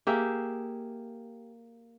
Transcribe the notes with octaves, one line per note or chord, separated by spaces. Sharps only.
A#3 G4 G#4 E5